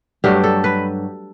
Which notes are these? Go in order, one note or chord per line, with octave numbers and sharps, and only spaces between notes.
G2 F#3 A3 D4 G4
A4
B4